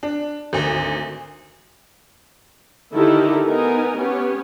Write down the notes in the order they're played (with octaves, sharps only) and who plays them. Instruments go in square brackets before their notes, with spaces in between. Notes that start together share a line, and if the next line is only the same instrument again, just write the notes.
[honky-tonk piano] D4
G#1 D2
[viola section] D3 D#3 D#4 E4 G4 A4
B3 D#4 A#4 G#5
B3 C#4 G4 C#5